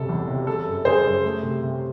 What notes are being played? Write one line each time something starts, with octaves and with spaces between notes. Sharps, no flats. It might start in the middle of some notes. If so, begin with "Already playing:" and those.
Already playing: F#1 F#2 C3 A4
E2
C3
C#3 A4
F#2
C#3 G#4 C5
F#2
A3
C3
C3